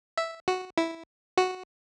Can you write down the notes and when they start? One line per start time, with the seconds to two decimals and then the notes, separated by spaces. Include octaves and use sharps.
0.18 E5
0.48 F#4
0.78 E4
1.37 F#4